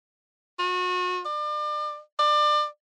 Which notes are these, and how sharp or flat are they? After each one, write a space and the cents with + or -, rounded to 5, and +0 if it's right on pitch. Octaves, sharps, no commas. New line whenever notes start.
F#4 -35
D5 +35
D5 +30